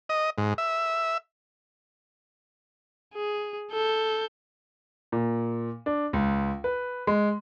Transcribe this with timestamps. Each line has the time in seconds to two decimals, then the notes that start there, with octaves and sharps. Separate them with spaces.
0.09 D#5
0.38 G#2
0.58 E5
3.14 G#4
3.72 A4 G6
5.12 A#2
5.86 D4
6.13 C#2
6.64 B4
7.07 G#3